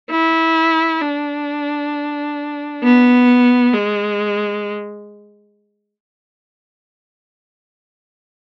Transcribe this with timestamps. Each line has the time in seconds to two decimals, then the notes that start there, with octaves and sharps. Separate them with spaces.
0.11 E4
1.01 D4
2.83 B3
3.74 G#3